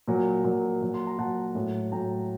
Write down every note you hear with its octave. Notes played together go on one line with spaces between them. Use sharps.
A#2 F#3
A#2 F#3
A#2 F#3
C6
A#5
A#2 F#3 F#5 A5
A2 F#3
A2 F#3 G5 A#5